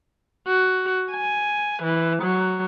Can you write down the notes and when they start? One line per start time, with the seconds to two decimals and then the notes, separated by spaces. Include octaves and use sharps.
0.47 F#4
1.12 G#5
1.83 E3
2.23 F#3